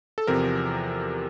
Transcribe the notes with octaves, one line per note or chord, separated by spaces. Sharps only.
A4
E2 C3 F3 A#4